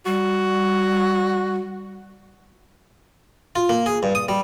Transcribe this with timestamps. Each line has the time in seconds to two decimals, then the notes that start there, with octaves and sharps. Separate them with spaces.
0.06 G3 F#4
3.56 F4
3.69 A#3
3.86 G#4
4.03 G2
4.15 D#6
4.29 G3